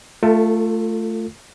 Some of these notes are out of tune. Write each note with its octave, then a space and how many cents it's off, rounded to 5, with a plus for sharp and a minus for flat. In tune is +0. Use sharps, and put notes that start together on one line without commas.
A3 +0 F4 +0 A4 +35